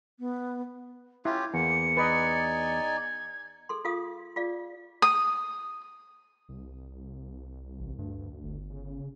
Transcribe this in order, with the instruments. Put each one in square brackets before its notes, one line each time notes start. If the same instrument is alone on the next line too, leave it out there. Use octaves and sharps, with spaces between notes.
[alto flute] B3
[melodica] C#4 F4 G4 [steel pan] E4 [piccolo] G#6
[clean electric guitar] E2 [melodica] A#3 [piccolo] C#7
[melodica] D#4 D5 G#5 [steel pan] B4 D#5
[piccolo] G#6
[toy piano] G#4 A4 C6
F4 G#4 A4 F5 D#6
F4 G#4 D5 F5
[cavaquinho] D#6
[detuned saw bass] C2
[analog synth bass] A1
[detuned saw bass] D2 [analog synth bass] G2
[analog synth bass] G1
[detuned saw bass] C#3